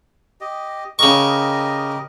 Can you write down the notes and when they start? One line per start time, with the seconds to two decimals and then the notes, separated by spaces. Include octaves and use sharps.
0.41 G4 D#5
0.99 C#3 G4 A#4 D#5 C#6